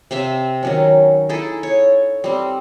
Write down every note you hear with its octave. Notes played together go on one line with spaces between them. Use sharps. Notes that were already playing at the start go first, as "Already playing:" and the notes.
C3 C5 E5 F5
D#3 F#3 C#4
D#4 E4 G#4 A4
C#5
G3 C4